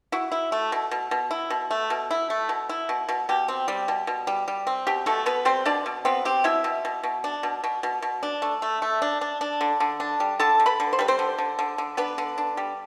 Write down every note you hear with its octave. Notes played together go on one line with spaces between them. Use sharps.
E4 F#4
E4
A3
B2
B2
B2
E4
B2
A3
B2
E4
A3
B2
E4
B2
B2
B2 G4
C4
G3
B2
B2
G3
G3
C4
B2 G4
B2 A3 A4
B2 B3 B4
G3 C4 C5
B2 D4 D5
B2
B3 C4 B4
C4 G4
B2 E4 E5
B2
B2
B2
D4
B2
B2
B2
B2
D4
A3
A3
A3
D4
D4
D4
D3
D3
D4
G3
D3 A4 A5
D3
B4 B5
D3
C5
G3 B4
C4 C5
D3
D3
D3
D3
B3 D4 B4
D3
D4
G3